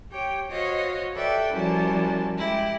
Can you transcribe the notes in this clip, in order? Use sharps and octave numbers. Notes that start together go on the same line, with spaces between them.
G4 C#5 G5
F#4 C5 C#5 D#5 F5
G4 A4 B4 D5 E5 G5
F#2 F3 G3 E4 F#4 A5
G#3 E4 G4